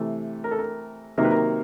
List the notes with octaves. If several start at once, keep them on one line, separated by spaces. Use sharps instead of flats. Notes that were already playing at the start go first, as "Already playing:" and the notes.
Already playing: C3 E3 A3
A#4
A4
A#4
C3 D#3 F#3 A#3 A#4
B4
A#4